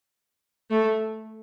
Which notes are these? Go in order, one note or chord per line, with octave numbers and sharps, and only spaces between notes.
A3